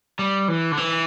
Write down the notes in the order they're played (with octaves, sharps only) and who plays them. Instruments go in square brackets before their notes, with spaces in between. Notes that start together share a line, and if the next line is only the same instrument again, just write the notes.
[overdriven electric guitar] G3
E3
D3
E3